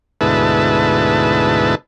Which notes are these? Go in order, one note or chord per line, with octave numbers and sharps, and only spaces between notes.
D2 G#2 B2 E4 B4 A5